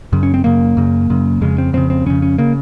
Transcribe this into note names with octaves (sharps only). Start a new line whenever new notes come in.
F#2 C#3
C#4
C4
F#2 C#3 A#3
F#2 C#3
F#2 C#3
F2 C#3 G#3
C4
F2 C#3 C4
C4
F2 C#3 C#4
C#4
C#3 A#3